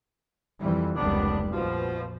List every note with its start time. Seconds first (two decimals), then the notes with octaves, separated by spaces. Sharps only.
0.58 F2 E3 G3
0.96 F1 C#2 D#3 G3 B3 D4
1.52 A#1 F2 B2 F3